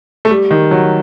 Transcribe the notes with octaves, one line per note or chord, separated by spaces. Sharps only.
A3
G3
D#3
F#3